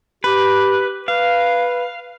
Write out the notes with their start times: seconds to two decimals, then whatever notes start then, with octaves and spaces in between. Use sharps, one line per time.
0.24 G4 B4
1.08 B4 F5